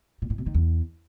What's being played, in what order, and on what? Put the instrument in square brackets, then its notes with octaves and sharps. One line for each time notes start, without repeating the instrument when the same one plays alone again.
[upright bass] A#2
A2
B2
D#3
E2